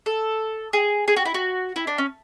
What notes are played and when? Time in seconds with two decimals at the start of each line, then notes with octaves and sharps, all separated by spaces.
0.06 A4
0.73 G#4
1.08 G#4
1.16 F#4
1.25 E4
1.34 F#4
1.76 E4
1.87 D4
1.98 C#4